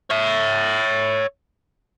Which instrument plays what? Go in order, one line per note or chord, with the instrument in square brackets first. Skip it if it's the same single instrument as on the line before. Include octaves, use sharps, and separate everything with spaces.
[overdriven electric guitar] C#5 E5